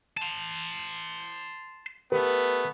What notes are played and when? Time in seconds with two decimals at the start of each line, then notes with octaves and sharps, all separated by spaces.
0.17 A5 C6
2.12 A3 B3 G4 A#4 B4